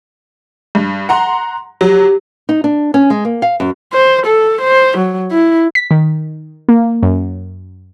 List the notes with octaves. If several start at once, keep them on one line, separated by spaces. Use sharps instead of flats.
G2
F#5 A#5 C6
F#3 G4
D#4
D4
C#4
G#3
A#3
F5
F#2
C5
A4
C5
F#3
E4
B6
D#3
A#3
F#2